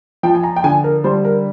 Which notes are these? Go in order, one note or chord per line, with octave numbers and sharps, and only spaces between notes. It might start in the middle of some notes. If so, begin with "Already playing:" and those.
F3 G5
G#5
A#5
G5
D3 G#5
A#4
G3 C5
A#4